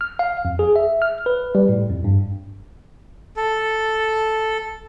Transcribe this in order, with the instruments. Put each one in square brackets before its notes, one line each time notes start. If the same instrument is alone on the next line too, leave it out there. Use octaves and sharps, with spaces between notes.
[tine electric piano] F6
F5
F2
G#4
E5
F6
B4
G3
A2
F2
G2
[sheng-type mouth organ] A4